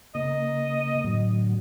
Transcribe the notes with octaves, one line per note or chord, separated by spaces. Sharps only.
C#3 A#3 D#5
A2 D3 F#3